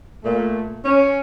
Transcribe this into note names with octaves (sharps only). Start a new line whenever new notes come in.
A#2 A3
C#4